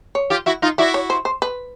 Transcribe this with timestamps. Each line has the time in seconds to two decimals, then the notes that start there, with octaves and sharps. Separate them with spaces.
0.15 C#5
0.30 F4 G4
0.46 E4 F#4
0.62 D#4 F4
0.78 E4 F#4 D5
0.94 C#5
1.10 C5
1.25 C5
1.42 B4